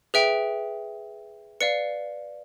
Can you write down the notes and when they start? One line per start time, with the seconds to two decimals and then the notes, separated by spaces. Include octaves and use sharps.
0.14 G#4 B4 E5 G5
1.61 B4 D5 F5 C#7